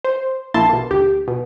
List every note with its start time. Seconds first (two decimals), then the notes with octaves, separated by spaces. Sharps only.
0.04 C5
0.54 A#1 A#3 E4 A5 C6
0.69 B2 A#3
0.90 D2 G4
1.28 B2